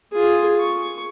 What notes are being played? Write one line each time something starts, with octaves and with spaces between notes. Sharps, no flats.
F4 G#4
C#6